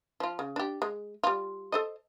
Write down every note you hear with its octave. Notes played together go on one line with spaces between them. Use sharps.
F3 F4
C#3
D4 G4
G#3
G3 F4
A4 C5 D#5